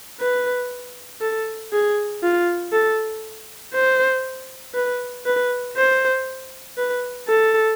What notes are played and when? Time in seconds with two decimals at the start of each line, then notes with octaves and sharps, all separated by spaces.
0.20 B4
1.21 A4
1.73 G#4
2.23 F4
2.73 A4
3.74 C5
4.75 B4
5.26 B4
5.77 C5
6.78 B4
7.28 A4